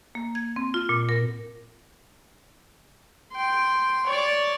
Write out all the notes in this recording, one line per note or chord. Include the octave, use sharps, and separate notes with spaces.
A#3
G#6
C4
F4
A#2
A#4
G5 C6
C#5 D5